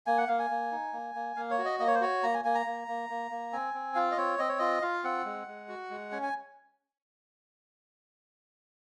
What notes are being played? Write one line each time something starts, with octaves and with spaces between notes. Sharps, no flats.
A#3 G#5
F#5
A#3 F5
G#5
A#3
D#4
A#3
A#3
A#3 F5
C#5
F#4
D#5
A#3 D#5
C#5
C5
F#4 C#5
A#3 A#5
G#5
A#3 G#5
A#5
A#3
A#3
A#3
A#3
C4 G#5
C4
F4 F5
D#5
C4 C#5
C4 D#5
C#5
F4 D#5
F4 F5
C4 F#5
G#3
G#3
F#4
G#3
C#4 G#5
G#5